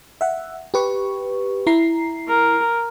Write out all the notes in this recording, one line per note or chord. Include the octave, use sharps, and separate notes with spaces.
E5 F#5
G4 B4 C#6
E4 A#5 C7
A#4